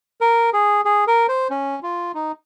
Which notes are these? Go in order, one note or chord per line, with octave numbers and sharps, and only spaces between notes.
A#4
G#4
G#4
A#4
C5
C#4
F4
D#4